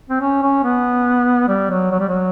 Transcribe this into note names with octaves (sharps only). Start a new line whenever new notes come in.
C4
C#4
C#4
B3
G3
F#3
F#3
G3
F#3